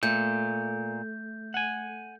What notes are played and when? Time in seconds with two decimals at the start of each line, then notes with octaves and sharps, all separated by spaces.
0.03 A#2 A3 G6
1.54 F#5 G#5